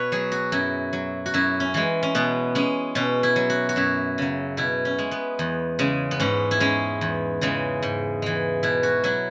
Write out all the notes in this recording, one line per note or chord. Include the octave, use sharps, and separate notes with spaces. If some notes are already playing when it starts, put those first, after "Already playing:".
Already playing: B2 B4 C#5
F#3 G#4
F#4
F#2 E4
F#3
F#4
F#2 E4
C#4
E3 G#3
C#4
B2 B3
G#3 C#4
B2 C#4
E4
F#3
F#4
F#4
F#2 E4
C#3 F#3
B2 E4
C#4
G#3
B3
E2
C#3 G#3
B3
G#2 C#4
E4
G#3 C#4
E2
C#3 E3 G#3
G#2
E3 G#3
B2 E4
F#4
F#3 E4